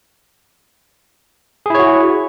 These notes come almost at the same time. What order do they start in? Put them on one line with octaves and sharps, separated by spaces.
G#4 E4 C#5 F#4